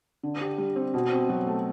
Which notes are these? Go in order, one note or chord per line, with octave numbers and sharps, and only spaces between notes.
D3
G4
G3
C4
B2
C4
F#3
A3